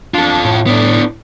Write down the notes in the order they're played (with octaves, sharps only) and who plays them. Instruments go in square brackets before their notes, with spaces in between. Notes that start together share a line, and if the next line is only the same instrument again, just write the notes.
[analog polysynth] D4 [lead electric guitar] F4 A4
[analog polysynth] A2
[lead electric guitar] B3 D4